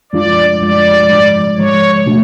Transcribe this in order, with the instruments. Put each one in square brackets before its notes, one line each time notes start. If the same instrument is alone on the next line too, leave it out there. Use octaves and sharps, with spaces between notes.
[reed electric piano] F#2 F3 G#3 D4 F4 [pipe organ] D5
[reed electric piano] F#2 F3 G#3 D4 F4 [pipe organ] D5
[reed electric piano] G#2 F3 G#3
[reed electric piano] G#2 F3 G#3 [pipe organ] C#5
[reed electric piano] B2 A3 D4 F#4